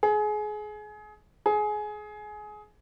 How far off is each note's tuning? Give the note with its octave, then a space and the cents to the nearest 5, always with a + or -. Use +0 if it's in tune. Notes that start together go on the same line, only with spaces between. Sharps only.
G#4 +25
G#4 +20